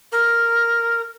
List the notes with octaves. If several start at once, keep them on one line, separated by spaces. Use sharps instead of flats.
A#4